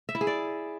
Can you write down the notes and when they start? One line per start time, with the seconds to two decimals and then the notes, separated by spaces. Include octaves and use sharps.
0.09 E5
0.15 E4
0.21 G#4
0.27 D5